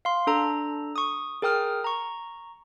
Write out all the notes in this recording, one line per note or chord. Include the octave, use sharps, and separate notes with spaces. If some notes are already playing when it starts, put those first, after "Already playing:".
F5 C6
D4 A4 A#5
C#6 D#6
G#4 A#4 G5 D#6 F6
A#5 C#6